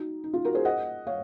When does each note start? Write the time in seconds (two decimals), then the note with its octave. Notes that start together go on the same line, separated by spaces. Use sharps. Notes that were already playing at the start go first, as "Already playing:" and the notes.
Already playing: D#4 F#4
0.24 D#4
0.34 F4
0.45 F#4 A#4
0.55 G#4 C5
0.65 D#5 F#5
1.07 C#5 F5